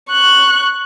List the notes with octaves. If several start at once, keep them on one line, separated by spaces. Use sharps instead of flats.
C#6 F#6